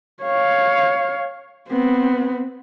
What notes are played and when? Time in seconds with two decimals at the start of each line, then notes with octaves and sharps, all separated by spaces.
0.23 C#5 F5
1.69 B3 C4